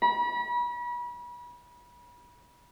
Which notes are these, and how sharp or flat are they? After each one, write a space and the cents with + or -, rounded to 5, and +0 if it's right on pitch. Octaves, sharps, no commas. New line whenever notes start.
B5 -35